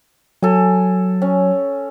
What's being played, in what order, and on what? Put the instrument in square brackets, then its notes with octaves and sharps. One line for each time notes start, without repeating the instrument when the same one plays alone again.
[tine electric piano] F#3 [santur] A4 G#5
[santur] C#4